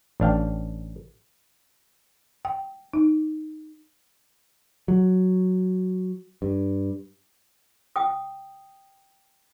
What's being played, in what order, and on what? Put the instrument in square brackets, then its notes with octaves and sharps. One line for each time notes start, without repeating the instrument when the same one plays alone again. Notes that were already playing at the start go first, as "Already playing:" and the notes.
[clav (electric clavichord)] A1 D4 F5 G5
[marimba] G5
D#4
[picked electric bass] F#3
G2
[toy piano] G5 D#6